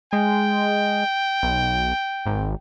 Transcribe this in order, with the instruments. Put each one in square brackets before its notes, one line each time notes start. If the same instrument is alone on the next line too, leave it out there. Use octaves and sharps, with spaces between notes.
[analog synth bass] G#3 [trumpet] G5
[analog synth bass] B1
G#1